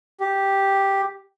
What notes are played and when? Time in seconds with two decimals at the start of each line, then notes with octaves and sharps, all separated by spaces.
0.20 G4